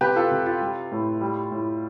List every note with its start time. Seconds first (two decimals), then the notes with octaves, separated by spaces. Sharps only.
0.01 C3 G4 B4
0.16 F4 A4
0.31 C3
0.46 F4
0.61 G3
0.91 A2
1.21 G3
1.51 A2